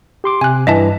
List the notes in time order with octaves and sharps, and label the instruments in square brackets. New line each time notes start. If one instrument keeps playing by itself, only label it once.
[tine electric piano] G4 C6 D6
[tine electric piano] C3 [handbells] G#5 F#6
[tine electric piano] G2 E3 [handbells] D#5 E5 A5